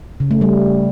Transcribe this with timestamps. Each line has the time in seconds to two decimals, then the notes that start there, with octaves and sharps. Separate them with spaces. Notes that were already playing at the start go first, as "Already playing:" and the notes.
0.20 C#3
0.31 A3
0.41 G3